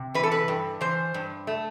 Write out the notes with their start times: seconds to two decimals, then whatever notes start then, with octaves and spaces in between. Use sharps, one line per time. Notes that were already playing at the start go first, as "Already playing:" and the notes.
Already playing: C3
0.14 E3 B4
0.23 A4
0.32 B4
0.48 G2
0.81 E3 C5
1.14 G2
1.47 A3